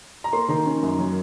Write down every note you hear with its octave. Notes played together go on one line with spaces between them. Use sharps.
A#5
A#3 C6
D#3 A#5
C#4
F#2
F#3